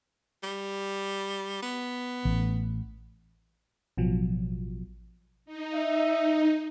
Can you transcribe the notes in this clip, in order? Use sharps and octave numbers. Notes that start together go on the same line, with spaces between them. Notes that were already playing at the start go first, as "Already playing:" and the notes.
G3
B3
A1
A1 B2 F3 F#3
D#4
E5